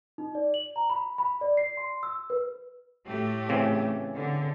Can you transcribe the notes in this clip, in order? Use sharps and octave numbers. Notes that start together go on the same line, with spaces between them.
D#4
D5
F#7
A#5
B5
B5
D5
C7
C6
E6
B4
A2 A3 G4
C#3 E3 C4
D3